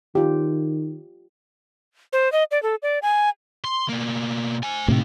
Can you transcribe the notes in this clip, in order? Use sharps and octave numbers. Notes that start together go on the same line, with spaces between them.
D#3 F4 G4
C5
D#5
D5
A4
D5
G#5
C6
B2 A#3
C5 G#5
A2 C3 A#3 D#4